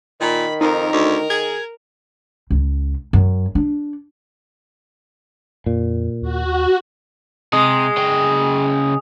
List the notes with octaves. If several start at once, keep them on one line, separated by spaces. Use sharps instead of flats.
A#2 D#3 B5
F2 D#4 A#4
D2
G#4 G#6
C#2
F#2
D4
F2 A#2
D#2 F#4
C3 G#3 D#6
C#3 G5